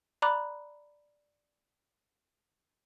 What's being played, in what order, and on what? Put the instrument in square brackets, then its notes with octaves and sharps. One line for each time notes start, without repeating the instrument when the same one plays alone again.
[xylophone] D5 A#5 B5 D6 F#6